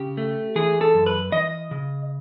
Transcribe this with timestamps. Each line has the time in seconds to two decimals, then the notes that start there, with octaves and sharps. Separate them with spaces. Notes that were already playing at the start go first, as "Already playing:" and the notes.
Already playing: C#3 G4
0.17 A3
0.56 E3 G#4
0.81 A4
0.94 F#2
1.06 B4
1.32 E3 D#5
1.71 C#3